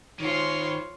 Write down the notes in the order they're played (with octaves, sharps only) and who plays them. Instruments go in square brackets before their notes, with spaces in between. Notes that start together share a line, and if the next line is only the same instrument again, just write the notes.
[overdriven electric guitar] D#3 C5 [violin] F4 C#5